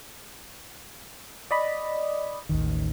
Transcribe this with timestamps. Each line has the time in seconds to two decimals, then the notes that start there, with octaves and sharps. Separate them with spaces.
1.51 D5 D#5 B5
2.49 A1 D#2 D#3